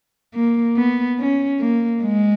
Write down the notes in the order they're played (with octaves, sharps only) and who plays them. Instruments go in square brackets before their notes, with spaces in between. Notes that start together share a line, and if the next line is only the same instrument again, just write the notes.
[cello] A#3
B3
C#4
A#3
G#3